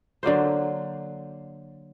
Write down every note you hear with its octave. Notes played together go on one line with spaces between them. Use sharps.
D3 F#3 A#3 C5